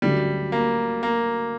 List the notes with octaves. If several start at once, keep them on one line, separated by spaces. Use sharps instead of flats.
D2 D3 F#3 G3 A3 C#4
A#3
A#3